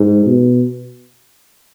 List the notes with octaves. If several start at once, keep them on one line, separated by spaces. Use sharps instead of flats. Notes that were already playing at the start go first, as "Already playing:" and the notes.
Already playing: G#2
B2